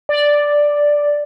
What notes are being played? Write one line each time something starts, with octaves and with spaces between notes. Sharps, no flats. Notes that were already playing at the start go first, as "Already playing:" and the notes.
D5